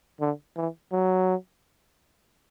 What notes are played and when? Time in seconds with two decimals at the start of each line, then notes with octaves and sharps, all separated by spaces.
0.20 D3
0.56 E3
0.92 F#3